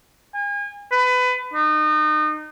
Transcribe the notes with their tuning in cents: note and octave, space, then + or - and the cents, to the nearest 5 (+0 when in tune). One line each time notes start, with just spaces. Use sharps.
G#5 -35
B4 +25
D#4 -30